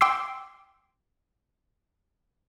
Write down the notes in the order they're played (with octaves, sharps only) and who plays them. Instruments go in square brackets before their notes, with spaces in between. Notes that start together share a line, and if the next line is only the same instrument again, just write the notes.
[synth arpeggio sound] G5 C6 D6 E6 C7